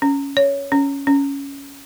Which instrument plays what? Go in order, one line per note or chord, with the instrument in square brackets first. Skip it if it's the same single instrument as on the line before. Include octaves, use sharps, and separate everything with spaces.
[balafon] C#4
C#5
C#4
C#4